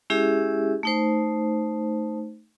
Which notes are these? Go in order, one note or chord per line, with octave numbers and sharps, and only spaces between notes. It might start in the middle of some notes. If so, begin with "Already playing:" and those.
G#3 C#4 E4 G4 G#4 E5
A3 D#4 C5